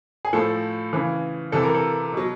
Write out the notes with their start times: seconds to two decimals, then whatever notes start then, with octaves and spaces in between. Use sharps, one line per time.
0.25 G#4
0.33 A2 F3 A4
0.93 C#3 E3
1.52 C3 E3 A4
1.63 A#4
1.74 A4
2.13 B2 F#3